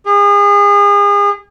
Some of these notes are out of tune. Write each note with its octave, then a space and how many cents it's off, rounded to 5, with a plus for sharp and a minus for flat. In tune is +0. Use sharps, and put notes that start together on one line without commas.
G#4 -35